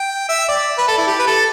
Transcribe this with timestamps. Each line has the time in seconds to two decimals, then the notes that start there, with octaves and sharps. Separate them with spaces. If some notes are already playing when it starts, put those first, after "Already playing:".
Already playing: G5
0.29 E5
0.48 D5
0.78 B4
0.88 A4
0.98 E4
1.07 G4
1.19 B4
1.27 A4